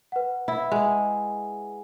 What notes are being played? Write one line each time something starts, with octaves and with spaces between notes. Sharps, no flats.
B4 F#5
E4
G#3